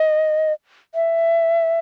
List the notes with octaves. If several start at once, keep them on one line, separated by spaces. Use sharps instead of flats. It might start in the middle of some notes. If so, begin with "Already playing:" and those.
Already playing: D#5
E5